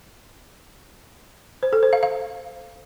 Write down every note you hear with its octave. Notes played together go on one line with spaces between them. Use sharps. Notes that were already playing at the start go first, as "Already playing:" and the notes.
C5
A4
C5
F5
F5